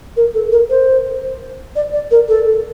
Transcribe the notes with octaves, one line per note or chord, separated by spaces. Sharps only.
A#4
A4
A#4
C5
D5
D5
A#4
A4